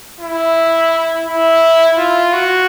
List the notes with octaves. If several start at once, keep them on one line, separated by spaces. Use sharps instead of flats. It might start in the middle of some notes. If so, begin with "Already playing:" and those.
E4
E4
F4
F#4